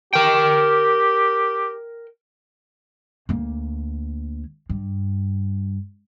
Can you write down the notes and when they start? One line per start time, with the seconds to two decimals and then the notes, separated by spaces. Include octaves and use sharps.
0.13 G4 A#4 G5
3.29 D2 A#3
4.69 G2